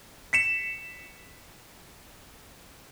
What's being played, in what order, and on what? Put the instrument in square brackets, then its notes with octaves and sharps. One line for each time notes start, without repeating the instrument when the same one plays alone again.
[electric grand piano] B6 C#7 E7